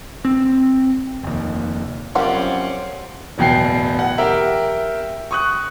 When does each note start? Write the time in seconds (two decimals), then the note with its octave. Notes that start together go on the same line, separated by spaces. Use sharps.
0.25 C4
1.23 F1 D#2
2.15 F#2 G3 C4 C#4 F4 D5 F#5
3.38 D1 E2 B2 G5 C7
3.99 F#5
4.18 G4 A#4 E5 G5
5.31 C#6 D#6 F#6